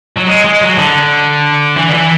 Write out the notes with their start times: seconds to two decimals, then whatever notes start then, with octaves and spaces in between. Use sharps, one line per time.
0.17 F#3
0.27 G#3
0.45 G#3
0.61 F#3
0.78 D3
1.77 E3
1.90 D3
1.94 E3